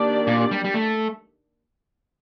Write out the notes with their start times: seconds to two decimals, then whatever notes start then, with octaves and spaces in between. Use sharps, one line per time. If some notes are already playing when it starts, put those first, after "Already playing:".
Already playing: D#3 A#3 D4 G4 D5
0.27 A#2
0.51 G3
0.64 G3
0.74 A3